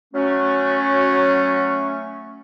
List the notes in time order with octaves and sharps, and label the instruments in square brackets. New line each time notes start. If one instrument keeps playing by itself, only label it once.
[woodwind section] F#3 A3 C#4